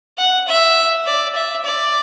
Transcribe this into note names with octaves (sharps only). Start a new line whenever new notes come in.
F#5
E5
D5
E5
D5